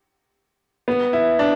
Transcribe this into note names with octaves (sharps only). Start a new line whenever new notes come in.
B3
E4
D4